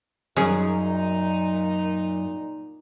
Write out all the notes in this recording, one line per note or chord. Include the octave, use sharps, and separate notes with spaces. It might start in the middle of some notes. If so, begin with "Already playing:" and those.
F#2 A#2 C#4 D#4 G#4